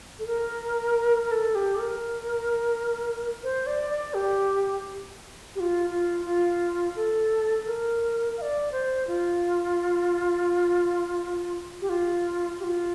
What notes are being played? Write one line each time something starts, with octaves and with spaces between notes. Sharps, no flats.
A4
A#4
A#4
A4
G4
A#4
C5
D5
D5
G4
G4
F4
F4
F4
A4
A#4
F5
D5
C5
F4
G4
F4
G4
F4